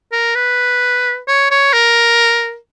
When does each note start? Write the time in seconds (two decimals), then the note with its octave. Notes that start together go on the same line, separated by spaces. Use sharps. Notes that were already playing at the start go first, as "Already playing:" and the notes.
0.12 A#4
0.35 B4
1.28 C#5
1.51 C#5
1.73 A#4